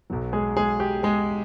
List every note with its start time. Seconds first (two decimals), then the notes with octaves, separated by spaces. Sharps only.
0.10 B1 B2 F#3
0.33 G#3 G#4
0.57 G#3 G#4
0.80 G4
1.03 G#3 G#4